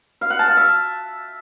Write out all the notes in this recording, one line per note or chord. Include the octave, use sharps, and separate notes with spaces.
F5
F#5
A5
F5
E5